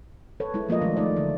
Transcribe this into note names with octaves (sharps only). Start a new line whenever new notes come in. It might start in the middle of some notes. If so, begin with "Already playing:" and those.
A4 B4 C#5
G#3 E4
F3 A#3 F4 D#5
D#3 F#3 G#3 A3 D4
G#3 A3 D#4 D5
D3 F#3 A#3